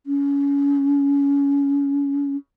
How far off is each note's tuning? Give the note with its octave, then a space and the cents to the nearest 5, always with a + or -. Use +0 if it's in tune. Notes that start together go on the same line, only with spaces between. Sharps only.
C#4 +25